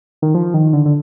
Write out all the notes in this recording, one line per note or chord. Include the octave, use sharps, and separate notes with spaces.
D#3
F3
D#3
D3
D3